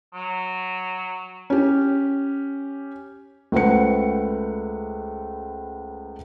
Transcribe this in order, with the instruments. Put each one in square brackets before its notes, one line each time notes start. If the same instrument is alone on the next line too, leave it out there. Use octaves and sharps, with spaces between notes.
[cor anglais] F#3
[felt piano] C#4 G4
C#2 A3 B4 C5 F#5 C#7